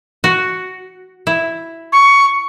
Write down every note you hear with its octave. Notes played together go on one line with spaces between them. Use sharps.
F#4
E4
C#6